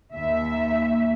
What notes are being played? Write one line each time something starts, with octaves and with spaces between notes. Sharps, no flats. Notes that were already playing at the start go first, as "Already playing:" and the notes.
D#2 E5